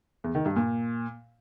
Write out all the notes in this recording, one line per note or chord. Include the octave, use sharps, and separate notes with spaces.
E2
D#3
G2
A#2